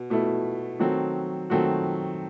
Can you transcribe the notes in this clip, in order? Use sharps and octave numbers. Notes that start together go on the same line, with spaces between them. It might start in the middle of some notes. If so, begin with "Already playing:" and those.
Already playing: B2
B2 A3 E4
D#3 F#3 A3 C4 F#4
D#3 F#3 A3 C4 F#4